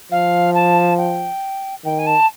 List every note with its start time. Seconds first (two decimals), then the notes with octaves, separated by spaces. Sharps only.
0.12 F3 F5
0.55 A5
0.98 G5
1.85 D#3 G5
1.99 G#5
2.07 A5